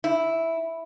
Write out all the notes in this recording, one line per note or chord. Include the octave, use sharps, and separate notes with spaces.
E4